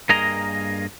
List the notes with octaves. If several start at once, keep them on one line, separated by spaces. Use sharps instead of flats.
G2 A#3 G#4 A#4 D#5 A#5